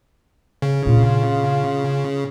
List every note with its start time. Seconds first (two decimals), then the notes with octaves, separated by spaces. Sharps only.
0.62 C#3
0.86 A#2 D4 F4